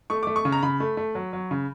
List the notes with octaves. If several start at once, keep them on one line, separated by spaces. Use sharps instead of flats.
A3 C#6
A3 D6
C#6
C#3
A#5
C#3 B5
A3
A3
F#3
F#3
C#3